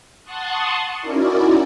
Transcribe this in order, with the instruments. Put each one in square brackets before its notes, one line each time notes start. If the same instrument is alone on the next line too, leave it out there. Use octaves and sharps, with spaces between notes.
[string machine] F#5 A5 C6 C#6 D#6 F#6
C#4 D#4 E4 F#4 A#4 D5